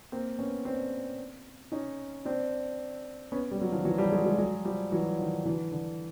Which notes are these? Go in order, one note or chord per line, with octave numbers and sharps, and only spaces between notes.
A#3 C4
B3 C#4
C4 D4
C#4 D#4
C4 D4
B3 C#4
G3
F#3
D#3 F3
E3 F#3
F3 G3
F#3 G#3
F#3 G#3
F#3 G#3
F3 G3
E3 F#3
D#3 F3
D3 E3
D3